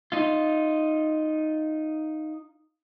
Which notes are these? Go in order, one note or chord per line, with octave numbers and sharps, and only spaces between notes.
D#4 F4